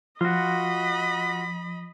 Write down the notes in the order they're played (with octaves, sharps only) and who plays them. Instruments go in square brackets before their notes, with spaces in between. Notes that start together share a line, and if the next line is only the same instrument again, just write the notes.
[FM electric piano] F3 [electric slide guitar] F4 F#4 [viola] D#5 B5